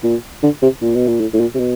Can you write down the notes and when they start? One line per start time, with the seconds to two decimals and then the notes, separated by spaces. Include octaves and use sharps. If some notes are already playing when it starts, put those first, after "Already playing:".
0.03 A#2
0.43 D3
0.62 C3
0.81 A#2
0.95 B2
1.07 A#2
1.20 A2
1.33 A2
1.40 A#2
1.55 C3
1.59 B2